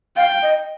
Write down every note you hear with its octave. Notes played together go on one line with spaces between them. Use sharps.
F5 G5
D#5